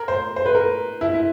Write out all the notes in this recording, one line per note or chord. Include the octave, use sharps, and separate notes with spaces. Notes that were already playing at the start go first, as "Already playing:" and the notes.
Already playing: A#4
C5
C5
B4
A#4
E4
E4